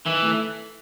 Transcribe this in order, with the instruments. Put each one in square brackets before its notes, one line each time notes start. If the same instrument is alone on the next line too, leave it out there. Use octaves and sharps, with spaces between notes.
[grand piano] D#3 [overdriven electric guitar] E3
[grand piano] A3 E4 A4